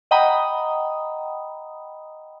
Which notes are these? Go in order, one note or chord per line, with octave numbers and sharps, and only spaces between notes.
D#5 F#5 G5 A#5 B5 D#6